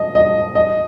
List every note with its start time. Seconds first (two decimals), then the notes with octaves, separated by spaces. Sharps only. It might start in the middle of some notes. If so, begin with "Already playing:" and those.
Already playing: D#5
0.15 D#5
0.55 D#5